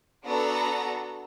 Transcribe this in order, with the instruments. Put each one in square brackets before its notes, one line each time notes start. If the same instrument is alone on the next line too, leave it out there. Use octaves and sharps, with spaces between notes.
[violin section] B3 D4 F#4 A4 A#5